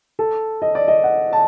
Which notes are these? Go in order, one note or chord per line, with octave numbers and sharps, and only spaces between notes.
A4
D#5
D5
D#5
F#5
A5